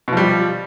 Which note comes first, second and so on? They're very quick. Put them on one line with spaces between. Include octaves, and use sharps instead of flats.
B2 F3 G3